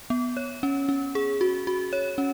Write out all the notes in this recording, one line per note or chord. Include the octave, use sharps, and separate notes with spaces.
B3
C#5
C#4
C#4
G#4
F#4
F#4
C#5
C#4